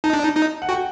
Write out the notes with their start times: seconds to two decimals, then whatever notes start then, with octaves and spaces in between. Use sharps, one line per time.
0.04 D#4 A5
0.13 D4
0.23 D#4
0.36 D#4
0.62 F#5
0.69 F#4 G5